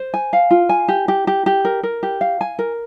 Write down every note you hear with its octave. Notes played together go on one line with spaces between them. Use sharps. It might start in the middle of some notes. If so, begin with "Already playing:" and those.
Already playing: C5
G#5
F5
F4
G#5
G4
G4
G4
G4
A#4
A#4
G4
F5
G#5
A#4